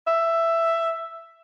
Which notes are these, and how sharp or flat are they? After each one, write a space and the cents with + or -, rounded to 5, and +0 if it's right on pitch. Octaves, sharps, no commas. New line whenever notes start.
E5 +10